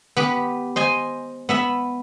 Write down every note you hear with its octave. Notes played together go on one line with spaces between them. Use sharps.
B3 G4 B4
C5 D#5 G#5
B3 E5 B5